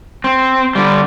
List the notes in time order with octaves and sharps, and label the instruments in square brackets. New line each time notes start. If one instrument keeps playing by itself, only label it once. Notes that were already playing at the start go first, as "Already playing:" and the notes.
[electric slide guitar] C4
D3 G3